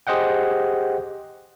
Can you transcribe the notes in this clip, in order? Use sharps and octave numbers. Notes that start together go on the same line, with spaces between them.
G4 G#4 C5 D#5 F#5 G5